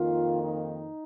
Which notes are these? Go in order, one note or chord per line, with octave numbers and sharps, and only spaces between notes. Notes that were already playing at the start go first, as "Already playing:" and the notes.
Already playing: F2 D#3 A#3 F4
D#4